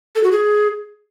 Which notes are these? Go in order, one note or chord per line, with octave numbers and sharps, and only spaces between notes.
A4
F#4
G#4